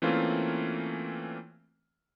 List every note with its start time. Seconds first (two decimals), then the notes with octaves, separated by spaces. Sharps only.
0.02 E3 A3 A#3 C4 C#4 F4